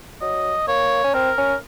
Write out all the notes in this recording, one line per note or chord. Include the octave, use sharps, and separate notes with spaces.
F#3 D#5
A#3 C#5
C#4
C4 A#4
C#4